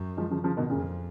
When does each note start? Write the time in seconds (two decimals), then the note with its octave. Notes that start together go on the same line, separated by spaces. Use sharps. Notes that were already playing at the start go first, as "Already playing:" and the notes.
Already playing: F#2
0.17 F3 G#3
0.30 C#3 F3
0.44 C#3 F3
0.57 B2 D#3
0.70 F2 A#2 C#3